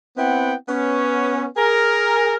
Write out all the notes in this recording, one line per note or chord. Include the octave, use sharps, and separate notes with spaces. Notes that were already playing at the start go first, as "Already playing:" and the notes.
B3 C4 E4 F#5 G5
B3 C#4
G#4 A#4